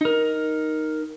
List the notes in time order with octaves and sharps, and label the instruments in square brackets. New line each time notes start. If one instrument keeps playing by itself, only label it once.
[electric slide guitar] D#4 A#4